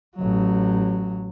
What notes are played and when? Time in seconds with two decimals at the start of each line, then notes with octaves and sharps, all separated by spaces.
0.16 A1 F#3